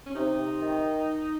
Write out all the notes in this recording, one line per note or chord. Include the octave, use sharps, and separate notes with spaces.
C#4
C3 D#4
C3
D#3